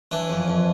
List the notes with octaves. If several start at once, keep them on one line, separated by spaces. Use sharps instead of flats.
E3 D4
F2
F2